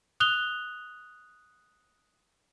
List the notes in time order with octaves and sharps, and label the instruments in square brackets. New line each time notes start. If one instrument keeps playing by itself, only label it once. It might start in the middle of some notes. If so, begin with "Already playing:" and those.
[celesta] D#6 F#6 F7 G7